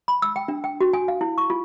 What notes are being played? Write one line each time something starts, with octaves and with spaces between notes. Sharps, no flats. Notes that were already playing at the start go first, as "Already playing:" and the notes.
B5
E6
G5
D4
G5
F#4
G#5
F5
E4
C#6
F4